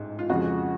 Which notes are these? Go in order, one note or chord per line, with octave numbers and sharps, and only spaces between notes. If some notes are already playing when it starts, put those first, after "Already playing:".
Already playing: A1 G#2
F4
F2 C#3 F3 G#3 F#4